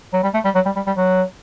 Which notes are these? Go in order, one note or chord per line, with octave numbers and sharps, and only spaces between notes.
F#3
G3
A3
G3
F#3
G3
G3
G3
F#3